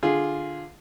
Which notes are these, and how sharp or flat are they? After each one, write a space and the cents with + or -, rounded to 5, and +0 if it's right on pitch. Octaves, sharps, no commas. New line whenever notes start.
D3 +5 F4 +0 G#4 +0